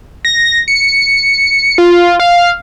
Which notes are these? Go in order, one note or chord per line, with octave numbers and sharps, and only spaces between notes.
A#6
C#7
F4
F5